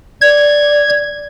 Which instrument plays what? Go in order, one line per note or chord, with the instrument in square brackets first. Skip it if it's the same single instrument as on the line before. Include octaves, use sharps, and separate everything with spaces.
[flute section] D5 [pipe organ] G#6